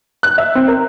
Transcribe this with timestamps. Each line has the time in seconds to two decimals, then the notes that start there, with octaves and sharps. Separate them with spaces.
0.23 F#6
0.38 E5
0.55 C4
0.68 A#4